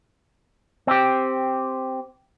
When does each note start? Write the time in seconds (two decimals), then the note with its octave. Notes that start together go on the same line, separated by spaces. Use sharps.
0.87 C4 G4